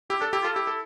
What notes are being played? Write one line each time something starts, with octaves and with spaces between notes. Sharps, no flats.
E4 G4
D4 A4
E4 G4
F4 A4
E4 G4
A4